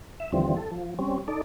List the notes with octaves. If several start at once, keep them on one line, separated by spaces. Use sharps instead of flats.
E5
D#2 D3 E3 F3 G3 C4
A4
F3
G3 C4 C#4
D#4 A4 D5